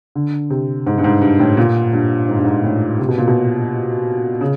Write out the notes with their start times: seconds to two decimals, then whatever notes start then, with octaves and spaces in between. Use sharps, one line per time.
0.15 D3
0.50 C3
0.86 G#2
0.98 G2
1.04 G#2
1.22 G2
1.40 A2
1.57 A#2
1.93 G2
2.29 G#2
2.36 G2
2.45 G#2
2.64 A2
2.99 C3
3.09 B2
3.18 A#2
3.28 B2
4.41 C#3